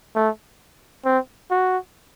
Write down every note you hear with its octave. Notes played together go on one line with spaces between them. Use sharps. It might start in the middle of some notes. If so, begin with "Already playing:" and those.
A3
C4
F#4